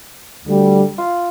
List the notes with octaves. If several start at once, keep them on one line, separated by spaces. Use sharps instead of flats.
D2 D3 G3
F4